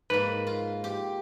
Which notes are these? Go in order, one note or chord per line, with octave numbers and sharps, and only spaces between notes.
G#2 A#3 B4
F4
G4